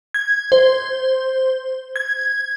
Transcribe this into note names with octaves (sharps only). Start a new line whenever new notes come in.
G#6
C5
G#6